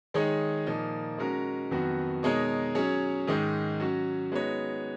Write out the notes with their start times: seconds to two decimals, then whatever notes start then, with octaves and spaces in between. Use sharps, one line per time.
0.14 D#3 G#3 D#4 G#4 C#5
0.66 A#2 F3 A#3 D#4
1.18 G#3 C#4 F#4 A#4
1.71 F2 D#3 F#3 B3 F#4
2.23 B2 G#3 D#4 A#4 C#5
2.75 F#3 C#4 G#4 C#5
3.27 G#2 D#3 G#3
3.80 F#3 C#4 F#4
4.32 G#3 B3 D#4 F#4 C#5